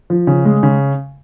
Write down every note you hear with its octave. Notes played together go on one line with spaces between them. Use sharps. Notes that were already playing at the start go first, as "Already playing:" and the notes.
F3
C#3
G#3
C#3